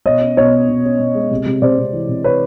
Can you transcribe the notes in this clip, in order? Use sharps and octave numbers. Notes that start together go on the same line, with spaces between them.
B2 C#5 D#5
C#4
B2 C#5 D#5
C#4
B2
C#4
B2
G#3
C3
C3
C3 C5 D5
C3
E3
C3
C3 B4 C#5